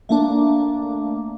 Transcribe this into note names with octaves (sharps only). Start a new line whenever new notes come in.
A3 A#3 D4